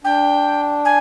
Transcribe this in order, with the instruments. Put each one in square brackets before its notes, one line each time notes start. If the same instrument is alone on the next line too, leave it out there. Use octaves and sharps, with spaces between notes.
[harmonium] D4 [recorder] G5
[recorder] G#5